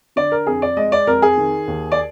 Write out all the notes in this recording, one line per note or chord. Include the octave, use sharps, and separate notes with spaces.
D3 D5
A#4
F2 G#4
D5
G#3 D#5
D5
F2 A#4
G#4
D#3
D#2
D5